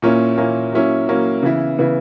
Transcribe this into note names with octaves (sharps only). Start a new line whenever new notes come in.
A#2 A#3 C#4 E4
A#2 A#3 C#4 E4
F#3 A#3 C#4 E4
F#3 A#3 C#4 E4
C#3 E3 B3 E4
C#3 E3 B3 E4